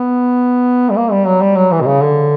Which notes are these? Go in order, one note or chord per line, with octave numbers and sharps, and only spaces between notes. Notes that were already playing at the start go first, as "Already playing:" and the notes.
Already playing: B3
G3
A#3
G3
F#3
G3
F#3
E3
B2
C#3
D3